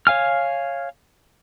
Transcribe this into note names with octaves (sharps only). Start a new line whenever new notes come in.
C#5 F5 G#5 F6